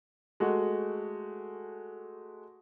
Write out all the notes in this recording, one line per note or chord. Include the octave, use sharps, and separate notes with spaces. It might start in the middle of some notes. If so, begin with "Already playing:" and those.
G#3 A3 F#4